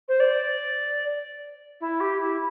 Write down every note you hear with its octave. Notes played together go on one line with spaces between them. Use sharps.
C5
D5
E4
G4
E4